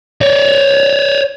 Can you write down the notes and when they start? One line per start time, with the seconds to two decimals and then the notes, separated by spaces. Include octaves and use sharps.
0.21 C#5 D5